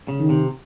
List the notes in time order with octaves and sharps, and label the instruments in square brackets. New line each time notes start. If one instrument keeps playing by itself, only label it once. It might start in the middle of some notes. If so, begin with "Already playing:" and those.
[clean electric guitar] C#3
[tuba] D#3
[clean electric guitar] C3